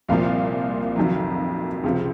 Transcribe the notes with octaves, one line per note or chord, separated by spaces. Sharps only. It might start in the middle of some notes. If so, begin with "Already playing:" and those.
C2 A#2 F3 F5
F1 F2 D#3 F#3
C#2 C3 F3